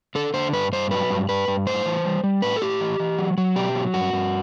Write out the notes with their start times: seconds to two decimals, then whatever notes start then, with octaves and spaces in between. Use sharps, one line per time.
0.15 D3 A4
0.34 D3 C5
0.53 G2 B4
0.72 G2 C5
0.91 F#3 B4
1.10 G2
1.29 G2 B4
1.48 G2
1.67 A2 C5
1.86 E3
2.05 G3
2.24 G3
2.42 A2 B4
2.56 A4
2.61 A2 G4
2.81 E3
3.00 E3
3.18 F#3
3.38 F#3
3.56 B2 G4
3.75 F#3
3.94 G2 F#4
4.13 G2